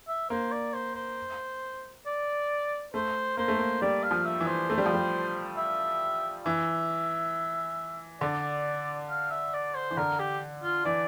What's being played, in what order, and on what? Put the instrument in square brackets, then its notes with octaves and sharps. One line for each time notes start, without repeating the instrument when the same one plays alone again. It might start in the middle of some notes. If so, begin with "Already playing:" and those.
[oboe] E5
[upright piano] A#3 [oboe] C5
[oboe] D5
C5
C5
D5
[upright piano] A3 [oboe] C5
[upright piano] A#3 [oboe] C5
[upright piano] A3
A#3
[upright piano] G3 [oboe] D5
[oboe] F5
[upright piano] F3
[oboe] E5
[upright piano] E3
[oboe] C5
[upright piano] A3
G3
F3
G3
[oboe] E5
[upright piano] E3 [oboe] E5
[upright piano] D3 [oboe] D5
[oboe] F5
E5
D5
C5
[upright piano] E3
[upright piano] D3 [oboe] A#4
[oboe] G4
F4
[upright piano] E3 [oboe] D5